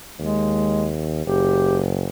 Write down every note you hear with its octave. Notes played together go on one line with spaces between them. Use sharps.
D#2 G#3
F#1 G4